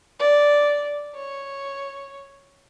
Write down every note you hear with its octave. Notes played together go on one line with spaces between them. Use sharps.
D5
C#5